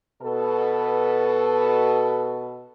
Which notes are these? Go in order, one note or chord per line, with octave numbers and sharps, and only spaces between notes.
B2 A4 B4